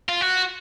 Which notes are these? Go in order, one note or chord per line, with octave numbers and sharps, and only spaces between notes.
F4
F#4